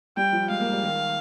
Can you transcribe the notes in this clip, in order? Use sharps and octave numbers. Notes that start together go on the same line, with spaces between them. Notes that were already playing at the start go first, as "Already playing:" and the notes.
G3 G5
F3
G#3 F5
A#3
G3
D#3